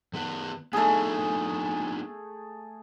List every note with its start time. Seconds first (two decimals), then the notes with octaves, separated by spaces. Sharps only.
0.13 D#3 B3 B4
0.73 A3 B3 D4 D#4 G#4